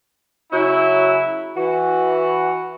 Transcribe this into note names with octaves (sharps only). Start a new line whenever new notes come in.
C#3 F#3 E4
E3 F#4